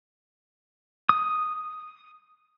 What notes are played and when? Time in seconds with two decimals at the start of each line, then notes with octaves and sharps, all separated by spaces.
1.09 D#6